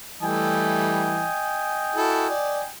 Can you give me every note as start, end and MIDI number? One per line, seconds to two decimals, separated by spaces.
0.21 1.26 52
0.21 1.26 55
0.21 1.26 57
0.21 2.70 75
0.21 2.70 79
0.21 2.70 80
1.95 2.29 64
1.95 2.29 66
1.95 2.29 69
2.29 2.60 74